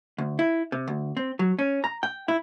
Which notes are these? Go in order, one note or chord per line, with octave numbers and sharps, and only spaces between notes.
D2
E4
C3
D2
C4
F#3
C#4
A#5
G5
E4